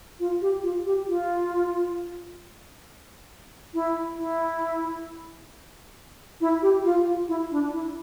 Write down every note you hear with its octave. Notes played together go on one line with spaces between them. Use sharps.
F4
G4
F4
G4
F4
E4
E4
E4
G4
F4
F4
E4
D4
E4